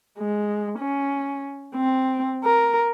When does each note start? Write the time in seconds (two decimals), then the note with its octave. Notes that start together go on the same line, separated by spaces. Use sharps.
0.19 G#3
0.79 C#4
1.75 C4
2.44 A#4